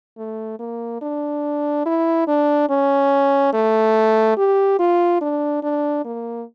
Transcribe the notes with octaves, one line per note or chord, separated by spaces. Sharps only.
A3
A#3
D4
E4
D4
C#4
A3
G4
F4
D4
D4
A#3